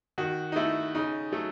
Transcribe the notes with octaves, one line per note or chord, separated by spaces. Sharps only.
D#3 F#4
D#4
A3 E4
C#3 D#4
F#3 A3